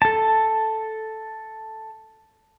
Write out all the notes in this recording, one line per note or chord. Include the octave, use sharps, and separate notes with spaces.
A4 A5